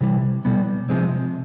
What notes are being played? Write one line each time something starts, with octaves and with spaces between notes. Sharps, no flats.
C3 E3 G3
B2 G3 B3
C3 F3 G#3 C4